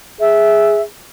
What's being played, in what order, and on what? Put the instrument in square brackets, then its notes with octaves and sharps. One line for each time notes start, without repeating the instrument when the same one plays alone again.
[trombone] G#4 [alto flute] E5